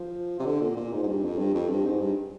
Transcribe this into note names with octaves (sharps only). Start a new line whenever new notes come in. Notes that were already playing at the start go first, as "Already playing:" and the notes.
Already playing: F3
C3
D3
A#2
A#2
G#2
G#2
G2
F2
G2
F2
G2
G#2
G2